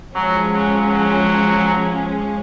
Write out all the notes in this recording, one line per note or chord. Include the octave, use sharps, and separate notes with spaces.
F3 F#3 G#3 C#4
F#3
F#3